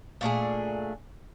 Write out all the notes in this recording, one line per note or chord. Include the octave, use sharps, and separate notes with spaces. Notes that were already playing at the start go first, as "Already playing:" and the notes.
A#2 A3 D4 G#4